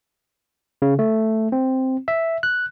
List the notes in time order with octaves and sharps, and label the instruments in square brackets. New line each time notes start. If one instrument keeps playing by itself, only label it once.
[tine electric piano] C#3
A3
C4
E5
F#6